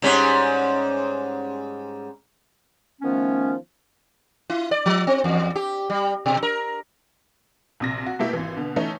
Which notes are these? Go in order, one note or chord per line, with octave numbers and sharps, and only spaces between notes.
G#2 G3 C#4
D#3 F3 A3 B3 C#4
E4
D5
F3
C4
E2
G4
G3
B2
A#4
A#1 C3 A#6
F#4
B2 A3 A#3 E4 G4
G#1 E3
B2 D3
E3 A3 C#4 D#4